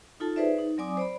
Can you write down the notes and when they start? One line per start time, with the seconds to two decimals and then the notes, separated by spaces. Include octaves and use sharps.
0.20 D#4 F4 A4 A5
0.36 D#4 G#4 B4 C5 D5 E5
0.59 D#4
0.78 F#3 C4 D5 G#5 D6 D#6
0.97 C5 D5 B5